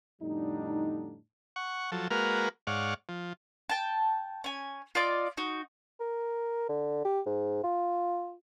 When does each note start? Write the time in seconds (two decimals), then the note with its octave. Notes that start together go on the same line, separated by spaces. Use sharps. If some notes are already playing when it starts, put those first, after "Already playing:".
0.21 F2 A2 D3 G3 D4 D#4
1.56 F#5 C#6
1.92 F3 F#3 A4
2.11 G#3 A#3 F#4 A#4 B4 F5
2.67 G#2 C#5 D5 F5 F#5
3.09 F3
3.70 G5 A5
4.44 C#4 G#5
4.95 F4 D5 D#5 D6
5.37 D#4 F#4
6.00 A#4
6.69 D3
7.05 G4
7.26 G#2
7.63 F4